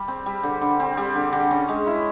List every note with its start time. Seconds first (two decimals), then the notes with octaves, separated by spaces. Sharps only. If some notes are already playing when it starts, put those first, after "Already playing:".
Already playing: G3
0.08 C4
0.26 G3
0.43 D3
0.62 D3
0.80 C4
0.97 G3
1.15 D3
1.33 D3
1.51 C#4
1.69 G#3
1.87 E4